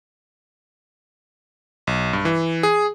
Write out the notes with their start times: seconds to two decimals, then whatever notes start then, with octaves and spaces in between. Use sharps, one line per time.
1.87 B1
2.13 G2
2.25 E3
2.63 G#4